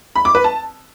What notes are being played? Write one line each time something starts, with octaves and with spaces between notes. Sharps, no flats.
B5
D6
B4
A5